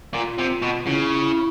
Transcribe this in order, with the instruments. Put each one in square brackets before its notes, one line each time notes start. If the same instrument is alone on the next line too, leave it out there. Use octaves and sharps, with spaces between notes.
[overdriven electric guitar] A#2 [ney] F4
[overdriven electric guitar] C3
B2
[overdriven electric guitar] C#3 [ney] E4